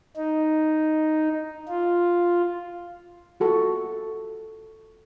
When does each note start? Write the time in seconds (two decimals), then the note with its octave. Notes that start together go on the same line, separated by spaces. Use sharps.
0.17 D#4
1.68 F4
3.40 F4 F#4 A4